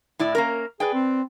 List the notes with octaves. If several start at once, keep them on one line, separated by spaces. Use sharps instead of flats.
A2 E4 D5
A#3 C#4 A#4
G#4 B4 D5 G5
C4